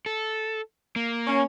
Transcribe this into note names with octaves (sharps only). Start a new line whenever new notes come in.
A4
A#3
C#4